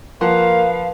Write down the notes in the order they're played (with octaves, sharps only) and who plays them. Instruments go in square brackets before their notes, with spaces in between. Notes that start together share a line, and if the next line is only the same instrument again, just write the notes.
[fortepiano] F3 F#5 C6 [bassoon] A#3 [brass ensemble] B4 [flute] F5